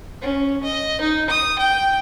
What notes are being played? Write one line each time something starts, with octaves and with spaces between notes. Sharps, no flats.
C#4
D#5
D#4
D#6
G5